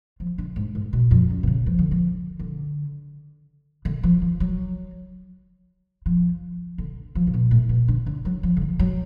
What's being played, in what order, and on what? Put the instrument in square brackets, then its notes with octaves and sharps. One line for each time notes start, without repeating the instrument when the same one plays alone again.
[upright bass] F3
D3
G#2
G#2
B2
F2
F#2
B2
C#3
F3
D3
F3
D3
D3
F3
F3
F#3
F3
D3
F3
C#3
B2
A2
B2
D3
D3
F#3
F3
D3
F3
F#3